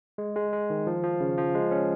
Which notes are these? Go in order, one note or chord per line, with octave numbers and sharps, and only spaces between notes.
G#3
G#3
G#3
D#3
F3
F3
C#3
F3
G#3
C#4